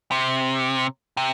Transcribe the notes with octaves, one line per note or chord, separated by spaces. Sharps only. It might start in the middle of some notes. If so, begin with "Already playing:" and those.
C3
C3